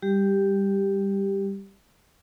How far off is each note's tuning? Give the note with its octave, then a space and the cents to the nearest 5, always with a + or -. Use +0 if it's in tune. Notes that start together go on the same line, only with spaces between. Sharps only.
G3 +15 G4 +0